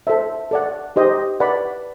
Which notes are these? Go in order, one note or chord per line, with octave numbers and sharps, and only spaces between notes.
A4 C5 E5
A4 D5 F#5
D#4 G4 C5 D#5
B4 D5 F#5 B5